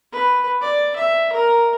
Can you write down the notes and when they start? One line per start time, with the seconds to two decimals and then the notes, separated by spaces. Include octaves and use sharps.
0.12 B4
0.62 D5
0.96 E5
1.33 A#4